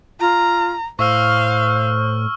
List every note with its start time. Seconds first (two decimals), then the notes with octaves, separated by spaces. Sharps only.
0.20 F4 A#5
0.99 A2 C5 F5 C#6 E6 F6